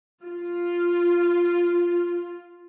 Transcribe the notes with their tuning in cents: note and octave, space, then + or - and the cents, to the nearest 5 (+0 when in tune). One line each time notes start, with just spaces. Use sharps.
F4 +0